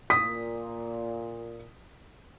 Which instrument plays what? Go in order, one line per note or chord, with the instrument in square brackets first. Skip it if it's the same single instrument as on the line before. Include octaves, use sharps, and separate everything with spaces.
[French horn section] A#2 [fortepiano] D#6 [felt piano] B6